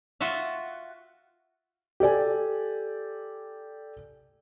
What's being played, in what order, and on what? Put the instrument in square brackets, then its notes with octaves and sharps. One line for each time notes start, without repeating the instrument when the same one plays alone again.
[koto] F4 F#4 E5 F5
[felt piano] G4 A4 D5 G#5